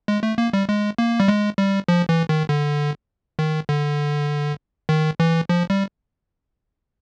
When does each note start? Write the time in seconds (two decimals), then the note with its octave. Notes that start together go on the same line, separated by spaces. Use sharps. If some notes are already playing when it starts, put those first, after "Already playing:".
0.08 G#3
0.23 A3
0.38 A#3
0.53 G3
0.69 G#3
0.98 A#3
1.20 G3
1.28 G#3
1.58 G3
1.88 F3
2.09 E3
2.29 D#3
2.49 D3
3.39 D#3
3.69 D3
4.89 D#3
5.20 E3
5.49 F3
5.70 G3